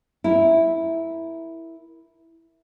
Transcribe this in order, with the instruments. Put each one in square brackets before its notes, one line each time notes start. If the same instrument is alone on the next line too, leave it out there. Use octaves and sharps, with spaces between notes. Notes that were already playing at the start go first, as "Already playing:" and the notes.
[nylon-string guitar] E4 A#4